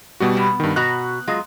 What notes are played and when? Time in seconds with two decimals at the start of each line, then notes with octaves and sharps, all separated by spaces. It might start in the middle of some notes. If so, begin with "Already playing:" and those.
0.20 B2 G3 F#4
0.37 B3
0.60 G2 D#3
0.76 B2 F#4 A#5 F#6
1.27 F#3 G#3 F4